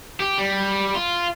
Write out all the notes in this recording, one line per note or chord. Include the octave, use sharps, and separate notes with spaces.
G4
G3
F4